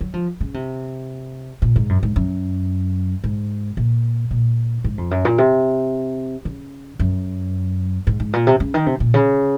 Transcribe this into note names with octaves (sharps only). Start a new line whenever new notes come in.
F#3
F3
C#3
C3
A#2
G#2
F#2
G#2
F#2
G#2
A#2
A#2
G#2
F2
F#2
A#2
C3
C#3
F#2
G#2
G#2
A#2
C3
C#3
D#3
C3
A#2
C#3